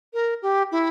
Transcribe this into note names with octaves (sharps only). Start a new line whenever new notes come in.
A#4
G4
E4